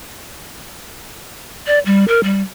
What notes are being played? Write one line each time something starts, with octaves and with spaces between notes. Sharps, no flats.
D5
G3
A#4
G3